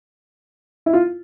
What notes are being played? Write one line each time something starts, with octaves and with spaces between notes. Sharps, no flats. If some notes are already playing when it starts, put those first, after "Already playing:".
E4
F4